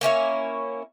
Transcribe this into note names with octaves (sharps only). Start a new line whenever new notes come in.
A#3 C#4 E4 C#5